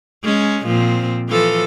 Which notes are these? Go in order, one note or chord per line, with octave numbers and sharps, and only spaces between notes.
G#3 C#4
A#2 F3 C4
E3 F3 A4